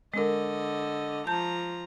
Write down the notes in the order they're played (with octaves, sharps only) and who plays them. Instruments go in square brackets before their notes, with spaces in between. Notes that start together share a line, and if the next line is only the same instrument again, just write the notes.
[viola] D3 D#5 [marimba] G#3 A#4
[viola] F3 A#5 [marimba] A5 G6